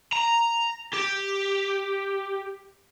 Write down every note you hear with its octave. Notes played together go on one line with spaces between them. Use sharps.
A#5
G4